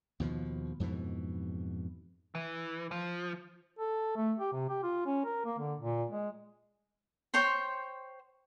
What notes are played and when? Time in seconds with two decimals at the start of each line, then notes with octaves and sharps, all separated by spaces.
0.20 D#2 B2 F3
0.80 F2 G#2 B2 E3
2.35 E3
2.91 F3
3.79 A4
4.16 A3
4.39 G4
4.52 C3
4.69 G4
4.83 F4
5.06 C#4
5.25 A#4
5.46 A#3
5.58 D3
5.80 A#2
6.10 G#3
7.34 C5 C#5 G5 C6